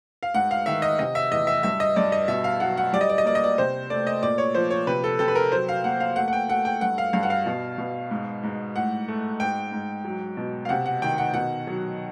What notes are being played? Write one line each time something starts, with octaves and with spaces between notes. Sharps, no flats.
F5
G#2 F#5
F5
D#3 E5
D#5
C3 D#5
E5
E2 D#5
E5
G2 E5
D#5
G2 D5
D#5
B2 E5
F5
F#3 F#5
F#5
G3 D5
D#5
D5
D#5
A#3 D5
D#5
D5
C3 C5
A3 D5
D#5
A#2 D5
C#5
F3 C5
C#5
C3 B4
A4
C3 A4
B4
A#4
F#3 C5
F5
A#3 F#5
F5
A3 F#5
F#5
G5
A3 F#5
G5
G2 F#5
F5
G2 F5
F#5
F5
B2
B2
G#2
G#2
A2 F#5
A3
G#2 G5
G#2
F#3
B2
F5
C3 F#5
F#5
D#3 G5
F#5
B2 F#5
F#3